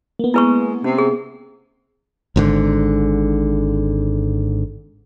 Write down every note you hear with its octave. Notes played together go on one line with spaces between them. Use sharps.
A#3 B3
G#3 E4 B4 C#6
C3 C#4
G#4
G#1 G#2 D3